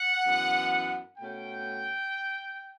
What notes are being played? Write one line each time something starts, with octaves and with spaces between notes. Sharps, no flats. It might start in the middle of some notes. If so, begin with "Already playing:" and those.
Already playing: F#5
F#2 E3 B3
B2 A3 C#4 G5